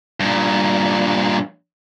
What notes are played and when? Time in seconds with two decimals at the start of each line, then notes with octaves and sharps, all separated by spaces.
0.20 G2 A#2